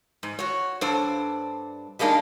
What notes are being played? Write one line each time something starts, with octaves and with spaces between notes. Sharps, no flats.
G#2
F#4 C#5
G2 D4 A4 C5
G3 G#3 A#3 D4 D#4